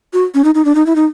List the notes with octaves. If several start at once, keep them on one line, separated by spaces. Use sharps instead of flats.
F#4
C#4
D#4
D#4
D4
D#4
E4
D#4